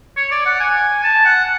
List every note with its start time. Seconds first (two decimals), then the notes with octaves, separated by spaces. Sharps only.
0.17 C#5
0.31 D5
0.46 F#5
0.60 G#5
1.04 A5
1.25 F#5